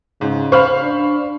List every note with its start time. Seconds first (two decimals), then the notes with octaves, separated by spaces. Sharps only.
0.21 G#2 C#3
0.52 C5 F5 B5 C#6 F6
0.82 D4